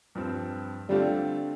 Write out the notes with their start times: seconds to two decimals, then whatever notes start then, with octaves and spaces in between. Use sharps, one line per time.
0.15 G2 F3 C4
0.89 D3 G3 A3 C4 F4